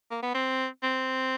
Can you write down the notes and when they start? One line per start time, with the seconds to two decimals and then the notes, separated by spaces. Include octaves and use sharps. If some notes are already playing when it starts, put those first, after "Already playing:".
0.11 A#3
0.23 B3
0.34 C4
0.83 C4